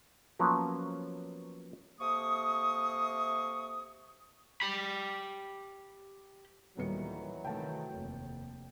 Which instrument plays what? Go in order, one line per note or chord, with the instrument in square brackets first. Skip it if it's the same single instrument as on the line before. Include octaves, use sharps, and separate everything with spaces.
[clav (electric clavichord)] F3 F#3 A#3 B3 C#4
[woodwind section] C3 A3 A#3 C#6 D#6
[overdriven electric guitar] G4 B5
[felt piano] D#1 B3 C#7 [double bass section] A#2 D#3 G3 [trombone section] E3 F#3
[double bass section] C3 D#3 A3 [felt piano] G5 A5
[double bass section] F1 D#2